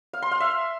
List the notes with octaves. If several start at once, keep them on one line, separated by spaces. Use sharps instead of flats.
F5
C6
F5
E5